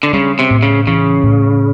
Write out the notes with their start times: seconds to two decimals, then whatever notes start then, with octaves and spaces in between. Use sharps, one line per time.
0.03 D3
0.13 C#3 G3
0.39 C3
0.51 A2
0.63 C#3
0.87 C#3 E3
1.24 A2